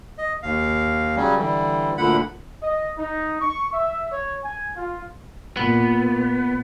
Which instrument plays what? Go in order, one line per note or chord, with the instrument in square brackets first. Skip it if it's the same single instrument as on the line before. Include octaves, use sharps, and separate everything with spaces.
[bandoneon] D#5
D#2 F5
C#3 F#3 G3 C#4
D3 E3 G3
D2 A#2 D3 F#5 B5
[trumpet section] D#5
D#4
C#6
E5
C#5
G#5
F4
[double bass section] A#2 [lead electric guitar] B3